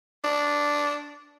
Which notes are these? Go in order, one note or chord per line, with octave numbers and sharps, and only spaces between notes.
D4